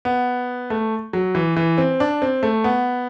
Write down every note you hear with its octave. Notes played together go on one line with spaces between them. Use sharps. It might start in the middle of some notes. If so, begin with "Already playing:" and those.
B3
A3
F#3
E3
E3
C4
D4
C4
A3
B3